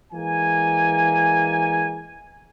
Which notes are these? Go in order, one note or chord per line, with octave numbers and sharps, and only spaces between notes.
E3 G#3 A#3 G#5